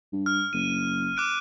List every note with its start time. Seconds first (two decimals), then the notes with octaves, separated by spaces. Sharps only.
0.13 G2
0.26 F6
0.53 F#1 D#7
1.17 D6 F#6 D7